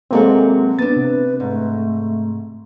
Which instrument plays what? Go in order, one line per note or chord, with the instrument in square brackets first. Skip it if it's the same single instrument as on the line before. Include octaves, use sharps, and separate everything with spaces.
[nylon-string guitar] C3 F#3 A4 [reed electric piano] G#3 A#3 C4
[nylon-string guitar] B3 D4 [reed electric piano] A6
[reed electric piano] C3 [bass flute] B4
[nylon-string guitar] G#2 [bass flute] A3